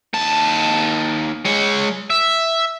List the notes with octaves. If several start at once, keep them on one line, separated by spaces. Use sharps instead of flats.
D#2 A5
G#3 C#5
E5